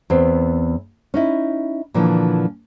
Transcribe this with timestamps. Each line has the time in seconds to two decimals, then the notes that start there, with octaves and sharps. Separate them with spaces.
0.10 E2 B3 C4
1.14 C#4 D#4 E4
1.94 A#2 D3 E3 F3